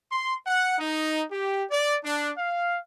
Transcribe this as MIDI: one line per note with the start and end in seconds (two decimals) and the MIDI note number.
0.12 0.35 84
0.47 0.77 78
0.78 1.23 63
1.31 1.63 67
1.71 1.97 74
2.04 2.31 62
2.37 2.78 77